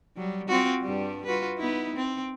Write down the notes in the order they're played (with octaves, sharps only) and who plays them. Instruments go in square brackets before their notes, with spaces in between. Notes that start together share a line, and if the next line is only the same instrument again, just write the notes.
[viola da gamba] F#3 G3
C4 F4 F#4
G2 G3
F4 F#4 B4
B3 D#4 E4
C4